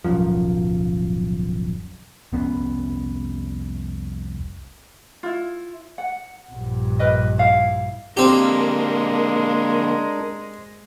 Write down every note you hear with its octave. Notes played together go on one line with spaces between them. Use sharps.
D1 B1 F#2 F3
F1 C2 B3 C#4
E4 F4
F#5
A#1 G2
A#4 B4 D#5
E4 F5
D3 G#3 A#3 C4 D4 G4 A#4